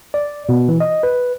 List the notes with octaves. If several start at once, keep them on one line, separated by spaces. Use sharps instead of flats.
D5
B2
E3
D#5
B4